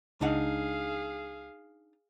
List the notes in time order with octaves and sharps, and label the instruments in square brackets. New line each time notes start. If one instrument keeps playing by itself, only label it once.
[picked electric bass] C#2 [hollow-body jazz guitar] D4 D#4 F#5 [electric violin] G#4 F5